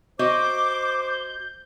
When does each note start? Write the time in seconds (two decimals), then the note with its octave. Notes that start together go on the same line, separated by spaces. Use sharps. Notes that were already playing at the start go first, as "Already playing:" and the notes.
0.19 F#4 C5 D#5 E5 D6 G6